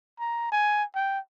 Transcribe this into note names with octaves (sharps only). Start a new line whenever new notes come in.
A#5
G#5
G5